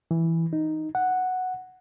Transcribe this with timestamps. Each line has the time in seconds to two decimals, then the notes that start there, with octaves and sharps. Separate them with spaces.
0.11 E3
0.53 D#4
0.95 F#5